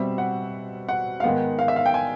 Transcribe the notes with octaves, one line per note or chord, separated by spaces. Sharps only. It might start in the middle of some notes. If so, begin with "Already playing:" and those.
Already playing: B2 G3 C4 E5
F#5
F#5
F5
G#2 D#3 G#3 B3 F#5
F5
E5
F5
G5
G#5